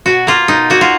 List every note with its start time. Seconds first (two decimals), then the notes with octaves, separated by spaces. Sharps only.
0.06 B2 F#4
0.27 A#3 F4
0.48 B2 D#4
0.70 A#3 F#4
0.81 F4